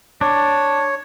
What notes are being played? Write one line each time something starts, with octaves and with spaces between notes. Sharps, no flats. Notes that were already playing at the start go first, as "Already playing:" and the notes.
D4 C#5